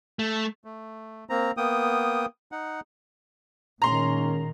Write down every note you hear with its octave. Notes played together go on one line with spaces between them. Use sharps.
A3
A3
A#3 C4 A#5
A#3 B3 G5 D#6
D#4 F#5
A#2 D#3 G#3 A#3 C#4 A#5 C6